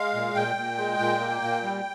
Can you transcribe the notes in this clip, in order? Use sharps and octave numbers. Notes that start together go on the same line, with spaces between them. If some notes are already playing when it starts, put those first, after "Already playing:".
Already playing: G#3 F5
A#2
A#2 G5
A#2
G#3
A#2
A#3
A#2
G3